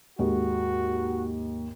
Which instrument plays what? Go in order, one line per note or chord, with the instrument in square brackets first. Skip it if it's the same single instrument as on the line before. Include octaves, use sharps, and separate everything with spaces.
[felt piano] D#2 G#2 [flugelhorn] F#4